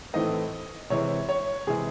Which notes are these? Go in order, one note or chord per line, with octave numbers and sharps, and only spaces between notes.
A2 E3 A3 C4 D#4 D#5
C3 E3 G#3 C#5
C#5
C3 E3 G#3 G#4